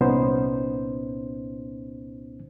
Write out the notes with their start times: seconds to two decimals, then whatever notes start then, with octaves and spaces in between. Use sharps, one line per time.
0.01 C2 A#2 B3 C#4 D#4 C5